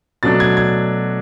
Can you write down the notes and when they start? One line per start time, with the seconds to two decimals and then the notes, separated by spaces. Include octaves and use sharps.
0.23 B2 F#3 A3 D4 A6
0.40 G#6
0.57 G#6